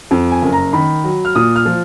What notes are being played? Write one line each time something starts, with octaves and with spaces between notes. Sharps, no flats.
F2
G#5
F#1
A#5
D#3 B5
F#3
F6
A#2 D#6
F6
F3